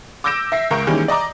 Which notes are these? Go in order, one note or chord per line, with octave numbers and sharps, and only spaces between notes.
D6 E6 G6 A#6 D7 E7
E5 A#6 C7
C#2 A#4 C#6 G6 D7
D#3 E3 G3 G#3 A#3 C#4
D5 D#5 A#5 D6